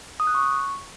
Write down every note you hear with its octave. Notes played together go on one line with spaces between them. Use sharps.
D#6
F#6
C#6